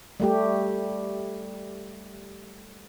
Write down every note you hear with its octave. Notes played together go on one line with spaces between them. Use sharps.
G3 A3 G4